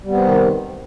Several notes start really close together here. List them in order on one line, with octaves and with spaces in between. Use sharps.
G3 B3 C4 C3 D#3